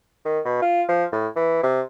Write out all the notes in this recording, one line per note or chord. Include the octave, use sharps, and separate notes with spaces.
D#3
B2
F4
F3
A2
E3
C3